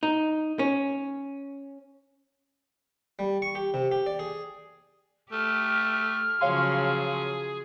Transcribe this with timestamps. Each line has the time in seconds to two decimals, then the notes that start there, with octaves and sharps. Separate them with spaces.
0.03 D#4
0.59 C#4
3.19 G3
3.42 C#6
3.55 G4
3.74 C3
3.92 G4
4.06 D5
4.19 G#4
5.32 A3 G4 F6
6.41 C#3 F3 F#3 G#4 C#5 F5 C6